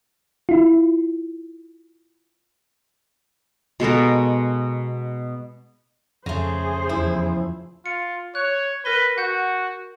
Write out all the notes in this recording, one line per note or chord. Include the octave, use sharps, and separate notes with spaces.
E4 F4
B2 G#3 A4 A#4
F2 C#3 A3 G#4 C5
E2 F3 E4
F4 C#7
C#5 F#6
A#4 B4 A#6 G7
F#4 F#5 G6